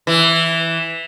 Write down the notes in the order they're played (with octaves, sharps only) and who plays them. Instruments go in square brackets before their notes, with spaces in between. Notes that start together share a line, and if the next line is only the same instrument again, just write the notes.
[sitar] E3